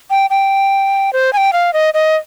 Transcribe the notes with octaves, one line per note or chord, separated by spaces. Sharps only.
G5
G5
C5
G#5
G5
F5
D#5
D#5